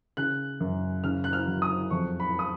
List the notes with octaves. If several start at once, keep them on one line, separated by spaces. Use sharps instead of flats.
C#3 F#6
F#2
C#3 F6
F#6
F6
F#3
D#6
F2 C#6
B5
D#6